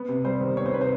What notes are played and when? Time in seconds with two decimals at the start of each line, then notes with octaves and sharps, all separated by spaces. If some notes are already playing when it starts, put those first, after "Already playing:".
Already playing: B3
0.09 C3
0.24 G3 C5
0.41 D#3
0.57 B3 C#5
0.66 C5
0.73 C3 B4
0.81 C5